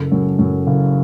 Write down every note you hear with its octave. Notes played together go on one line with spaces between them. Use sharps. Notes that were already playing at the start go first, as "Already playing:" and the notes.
Already playing: F#1 A4
F#2
F#2
F#1